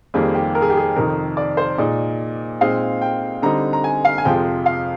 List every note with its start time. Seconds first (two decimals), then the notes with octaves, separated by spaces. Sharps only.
0.14 F2 D#3 G3 A#3 G#4
0.34 G4
0.55 A#4
0.62 G#4
0.70 G4
0.77 G#4
0.96 F2 C3 D#3 A#4
1.37 D5
1.57 C5
1.78 A#2 G#3 D#4 D5
2.61 A#2 G#3 C4 D#4 F5
3.02 G5
3.42 D3 G3 C4 D#4 A#5
3.73 A#5
3.84 G#5
4.05 F5
4.18 G#5
4.25 F2 C3 F3 G#3 G5
4.66 F5